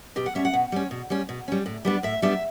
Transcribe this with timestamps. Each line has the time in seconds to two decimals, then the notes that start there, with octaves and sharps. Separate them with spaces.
0.16 B2 G4
0.26 F#5
0.35 G3 C#4 E5
0.45 F#5
0.53 B2
0.72 G3 C#4
0.91 B2
1.10 G3 C#4
1.29 B2
1.48 G3 C#4
1.66 A2
1.85 G3 B3 D4
2.03 A2 E5
2.22 G3 B3 D4 E5